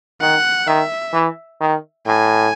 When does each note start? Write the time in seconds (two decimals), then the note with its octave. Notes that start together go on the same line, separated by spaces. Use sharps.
0.21 D#3 F#5
0.67 D#3 E5
1.13 E3
1.60 D#3
2.06 A2 G#5